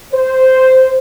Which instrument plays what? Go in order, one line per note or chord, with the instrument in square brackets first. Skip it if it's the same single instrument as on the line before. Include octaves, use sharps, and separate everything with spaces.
[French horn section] C5